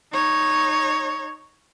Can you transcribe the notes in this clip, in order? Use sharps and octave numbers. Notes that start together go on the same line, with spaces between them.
D#4 C#5